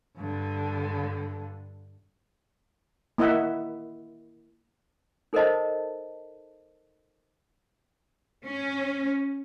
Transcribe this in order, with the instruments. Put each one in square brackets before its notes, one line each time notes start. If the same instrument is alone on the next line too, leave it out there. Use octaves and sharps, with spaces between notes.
[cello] G2 D3
[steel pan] A#3 E4 D#5 E5 F#5
[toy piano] D#4 A4 A#4 C5 D#5 A5
[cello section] C#4